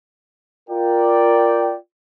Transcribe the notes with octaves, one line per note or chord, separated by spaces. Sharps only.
F4 A#4 D5 G5